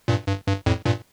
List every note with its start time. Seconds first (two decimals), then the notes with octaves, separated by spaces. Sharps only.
0.08 G2 A#2
0.27 G2
0.47 G2
0.66 F2 A2
0.85 G2 A#2